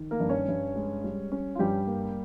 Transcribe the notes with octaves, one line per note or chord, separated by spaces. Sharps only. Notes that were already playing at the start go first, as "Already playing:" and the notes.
Already playing: D#3
A#3 A#4
G2
C#4 C#5
G2
G#3
G3
C#4
F4
G2 G3 G4
A#3